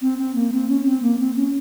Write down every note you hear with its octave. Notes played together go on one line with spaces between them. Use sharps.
C4
C4
A#3
C4
C#4
C4
A#3
C4
C#4